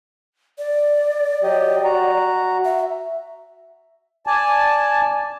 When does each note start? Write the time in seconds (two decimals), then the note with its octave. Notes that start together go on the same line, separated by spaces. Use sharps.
0.58 D5
1.43 F#3 G4 D#5
1.84 F#4 A#5
2.65 E5
4.27 D5 G#5 A5